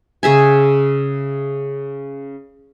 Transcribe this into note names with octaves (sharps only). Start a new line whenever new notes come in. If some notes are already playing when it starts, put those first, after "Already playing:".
C#3 G#4 E5 G#5